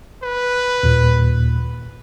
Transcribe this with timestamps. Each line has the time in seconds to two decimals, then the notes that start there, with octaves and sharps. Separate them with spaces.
0.23 B4
0.83 D#2 A#2